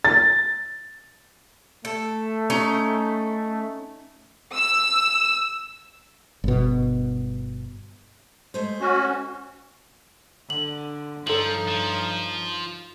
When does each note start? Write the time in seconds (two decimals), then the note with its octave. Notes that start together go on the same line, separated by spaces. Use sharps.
0.05 A6
1.85 A3 A4
2.50 C#4 D#4 A#5
4.55 E6
6.44 G1 B2
8.54 G#3 A3 C5
8.81 C#4 F#4
10.50 D3 F#7
11.27 G2 F3 D#4 A4 C#5 F#7
11.68 F3